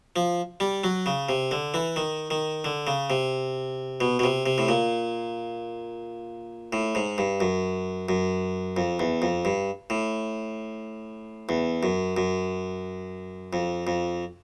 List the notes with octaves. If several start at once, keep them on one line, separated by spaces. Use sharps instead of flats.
F3
G3
F#3
C#3
C3
D3
E3
D#3
D#3
D3
C#3
C3
B2
B2
C3
C3
A2
A#2
A2
G#2
G2
F#2
F#2
F2
E2
F2
G2
A2
E2
F#2
F#2
F2
F2